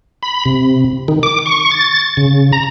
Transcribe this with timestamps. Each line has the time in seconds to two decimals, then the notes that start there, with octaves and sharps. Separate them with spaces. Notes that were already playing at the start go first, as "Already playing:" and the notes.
0.23 B5
0.46 C3
1.08 D#3
1.23 D6
1.46 C#6
1.71 A6
2.17 C#3
2.53 A#5